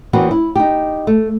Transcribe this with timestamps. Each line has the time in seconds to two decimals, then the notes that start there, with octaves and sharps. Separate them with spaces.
0.13 E2 E3 A#3 C4 C#4 F#4
0.31 E4
0.56 D#4 G4
1.07 A3